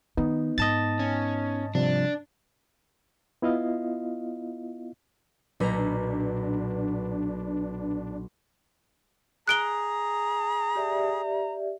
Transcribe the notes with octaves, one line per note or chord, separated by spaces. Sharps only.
D#3 B3 D#4
G#2 D#5 A5 A6
C#4
C3 F3 G3 D4
B3 E4 F4 D#5 F5
B1 A#2 D4 B4 A#5
G#4 A#5 F#6 D7 G7
G4 D5 E5